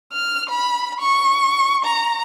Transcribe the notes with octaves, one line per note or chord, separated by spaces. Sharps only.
F6
B5
C#6
A#5